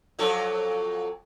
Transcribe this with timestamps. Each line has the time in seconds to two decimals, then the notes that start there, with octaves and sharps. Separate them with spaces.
0.19 F2 F#3 A4